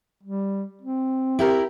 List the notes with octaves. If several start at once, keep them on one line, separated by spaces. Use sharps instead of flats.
G3
C4
E4 G4 A#4